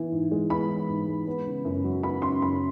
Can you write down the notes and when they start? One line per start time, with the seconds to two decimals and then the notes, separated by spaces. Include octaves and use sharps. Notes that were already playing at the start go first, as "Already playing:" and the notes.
Already playing: E3 B3
0.12 G#2
0.31 G#3
0.50 B3 B5
0.69 E3
0.88 G#2
1.08 G#3
1.27 B3
1.46 C#3
1.65 F#2
1.84 F#3
2.03 B3 B5
2.22 C#3 C6
2.42 F#2 B5